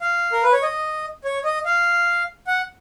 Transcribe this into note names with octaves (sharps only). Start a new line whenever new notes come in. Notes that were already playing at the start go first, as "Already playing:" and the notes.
F5
A#4
B4
C#5
D#5
C#5
D#5
F5
F#5